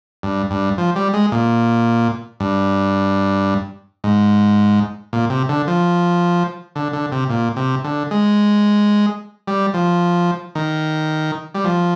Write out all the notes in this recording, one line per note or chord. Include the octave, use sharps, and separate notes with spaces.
G2
G2
F3
G3
G#3
A#2
G2
G#2
A#2
C3
D3
F3
D3
D3
C3
A#2
C3
D3
G#3
G3
F3
D#3
G3
F3